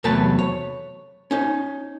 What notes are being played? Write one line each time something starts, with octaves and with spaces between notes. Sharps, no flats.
E2 C3 F#3 A3 B4 A5
C#5
C#4 D#4